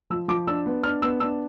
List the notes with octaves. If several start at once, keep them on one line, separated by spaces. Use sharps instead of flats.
F3 E6
F3 D6
D4 E6
B3
D4 F6
B3 E6
D4 E6